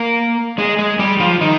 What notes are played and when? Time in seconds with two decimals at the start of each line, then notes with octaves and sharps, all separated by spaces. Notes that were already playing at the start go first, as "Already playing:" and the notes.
Already playing: A#3 A#4
0.58 G#3 G#4
0.79 G#3 G#4
0.99 G3 G4
1.20 F3 F4
1.41 D#3 D#4